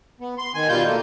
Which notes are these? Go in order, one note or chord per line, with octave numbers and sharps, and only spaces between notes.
B3
C6
D#3 G#5
B2 G3 F4 G6
A3 A#3